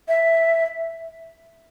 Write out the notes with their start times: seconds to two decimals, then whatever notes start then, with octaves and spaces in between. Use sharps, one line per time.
0.08 E5